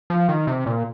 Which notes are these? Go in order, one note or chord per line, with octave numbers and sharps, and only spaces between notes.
F3
D#3
C3
A#2